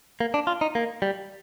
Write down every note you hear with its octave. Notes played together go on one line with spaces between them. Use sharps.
A#3
D4
F4
D#4
A#3
G3